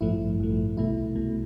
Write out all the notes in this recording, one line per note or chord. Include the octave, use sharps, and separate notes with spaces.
A1 G2 F3 A3 E4
A1 G2 F3 A3
C2 B2 A3 E4
C2 B2 A3